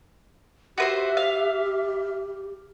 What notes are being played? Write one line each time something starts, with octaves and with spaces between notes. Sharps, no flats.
F#4 G4 B4 C5 E5
F5